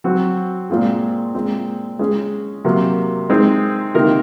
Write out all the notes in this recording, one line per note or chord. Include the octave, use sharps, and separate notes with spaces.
F#3 C4 F#4
A#2 G#3 C4 F4 G#4
A#2 G#3 C4
G#3 C#4 G#4
C3 F#3 A#3
G#3 C4 D#4
C3 D#3 A#3 D#4 A#4